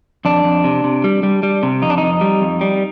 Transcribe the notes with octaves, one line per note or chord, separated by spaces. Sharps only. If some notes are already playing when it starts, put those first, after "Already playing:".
F2 D4
F2
C3
C3
G3
G3
G3
C3
F2 D#4
D4
F2 D#4
G3
F2
G3